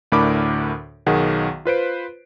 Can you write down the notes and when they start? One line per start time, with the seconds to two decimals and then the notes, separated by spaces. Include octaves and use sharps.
0.12 D2 A2 D4 A#4 B5 D6
1.06 B1 D#3 G#4 F#5
1.65 F4 B4 C5 D7